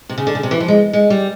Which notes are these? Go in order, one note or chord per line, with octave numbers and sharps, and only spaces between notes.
C3
C#3
D3
C#3
C3
E3
F3
G#3
G#3
G3